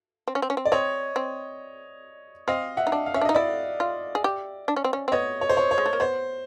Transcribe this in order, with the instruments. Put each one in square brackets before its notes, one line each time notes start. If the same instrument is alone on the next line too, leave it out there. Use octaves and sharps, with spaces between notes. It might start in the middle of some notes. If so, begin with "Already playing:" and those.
[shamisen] C4
C#4
C4
C#4
C4
[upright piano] D5
[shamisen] C4 [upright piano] C#5 D#5
[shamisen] C4
[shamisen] C4 [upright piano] D#5 F5
[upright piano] E5 F#5
[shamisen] D#4
D4
[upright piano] F5
[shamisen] C#4 [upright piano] E5
[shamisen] D4
[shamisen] D#4 [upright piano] D#5
[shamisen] E4 [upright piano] D5 E5
[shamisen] F4
G#4
G4
D4
C#4
C4
C#4
C4
[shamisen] B3 [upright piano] C#5 D#5
[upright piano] C#5
C5
C#5
C#5
[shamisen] G#3
A3
A#3
[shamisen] B3 [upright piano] C5